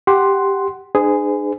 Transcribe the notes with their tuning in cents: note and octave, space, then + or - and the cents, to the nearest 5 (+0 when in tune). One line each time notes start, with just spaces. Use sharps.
G4 +0 F#5 +10 C6 +0
D4 +35 G#4 +0 C5 -45